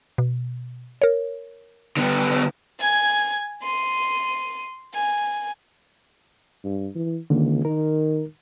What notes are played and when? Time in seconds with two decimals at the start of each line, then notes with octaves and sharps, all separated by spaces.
0.18 B2
1.02 A#4 C#5
1.97 D3 B3
2.80 G#5 G#6
3.63 C6 D#7
4.93 G#5
6.64 G2
6.95 E3
7.30 C#2 D3 D#3 A#3
7.65 D#3 A#4